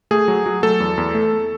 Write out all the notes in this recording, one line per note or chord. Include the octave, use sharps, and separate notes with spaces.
A3 G#4
F#3
F#3
A3 A4
E2
E2
A3